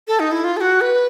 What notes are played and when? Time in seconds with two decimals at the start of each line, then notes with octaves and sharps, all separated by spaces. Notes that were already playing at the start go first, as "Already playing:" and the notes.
0.08 A4
0.20 D#4
0.32 E4
0.44 F4
0.57 A4
0.61 F#4
0.81 B4